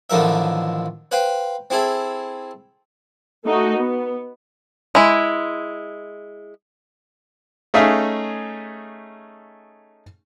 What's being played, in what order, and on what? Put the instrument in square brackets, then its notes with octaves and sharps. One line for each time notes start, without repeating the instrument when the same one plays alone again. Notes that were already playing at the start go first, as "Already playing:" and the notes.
[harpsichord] A1 D3 D#3 F3 A#4 E5
B4 C5 F5 G5
C4 E4 G#4 A4
[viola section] A3 D#4 F#4
B3
[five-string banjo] G#3 E4
[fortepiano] A3 C#4 D#4 G#4 E5 F5